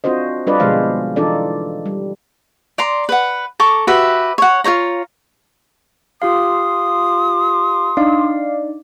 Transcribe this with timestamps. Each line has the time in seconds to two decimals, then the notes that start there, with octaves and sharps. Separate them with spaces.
0.04 C4 D4 F4 F#4 C5 D#5
0.47 G3 D4 F4 B4 D5 D#5
0.60 B2 D3 F3 G#3 C5 F5
1.16 E3 D4 D#4 F4 A4 D5
1.86 G3
2.78 D5 A#5 C6
3.09 B4 F#5
3.60 A4 A#5 C#6 D6
3.87 F#4 G4 B4 E5
4.38 C#5 F#5
4.64 F4 C5 C#5 A#5
6.22 F4 G4 F5 C6 D#6
7.97 D4 D#4 D5 F5